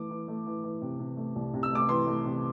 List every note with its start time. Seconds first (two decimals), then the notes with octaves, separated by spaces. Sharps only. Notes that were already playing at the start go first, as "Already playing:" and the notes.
Already playing: E3 A3 D6
0.11 E3
0.28 A3
0.47 E3
0.64 E3
0.81 C3
0.99 C3
1.17 A3
1.36 C2
1.54 C3
1.63 E6
1.72 A3 D6
1.89 E3 C6
2.07 A3
2.25 C3